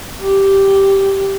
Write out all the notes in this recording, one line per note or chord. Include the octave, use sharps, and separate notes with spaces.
G4